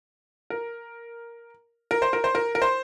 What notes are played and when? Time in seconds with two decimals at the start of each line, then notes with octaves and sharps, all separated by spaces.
0.50 A#4
1.91 A#4
2.02 C5
2.13 A#4
2.24 C5
2.35 A#4
2.55 A#4
2.62 C5